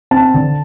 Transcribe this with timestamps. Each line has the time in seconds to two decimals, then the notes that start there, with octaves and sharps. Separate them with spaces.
0.11 C4 A5
0.34 D3